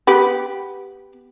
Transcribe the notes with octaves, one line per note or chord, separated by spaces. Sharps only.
B3 G4 B4